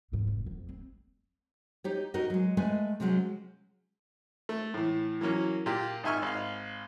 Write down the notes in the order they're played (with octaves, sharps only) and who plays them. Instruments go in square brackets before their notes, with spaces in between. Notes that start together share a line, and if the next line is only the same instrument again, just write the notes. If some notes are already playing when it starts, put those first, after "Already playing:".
[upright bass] G#2 C#3
F1
F2
C4
[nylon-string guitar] D#4 G4 C#5
D#4 F#4 A#4 B4 D#5
F#3 G#3
G#3 A3 B4 G#5
C3 F3 F#3 G#3 C#4
[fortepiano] A3
A2 E3
E3 F#3 A#3 C#4
A#2 F4 G4
G#1 D#3 E5 G#5 C#6 F6
G#1 F5